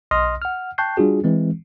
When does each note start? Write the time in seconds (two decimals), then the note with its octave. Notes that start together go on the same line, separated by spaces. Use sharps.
0.11 B1 D#5 C6 D#6 F6 A#6
0.42 F#5 F6
0.78 G5 A5 C#6 F#6 G6 C7
0.97 G3 D4 F4 F#4 G#4
1.24 E3 G#3 C4